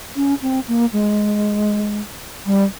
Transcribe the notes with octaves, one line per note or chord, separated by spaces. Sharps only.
C#4
C4
A#3
G#3
G3